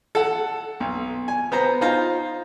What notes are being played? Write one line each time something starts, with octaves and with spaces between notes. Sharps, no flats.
A4 F#5
B1
G#5
B3 C5 A#5
D#4 F4 C5 F5 A#5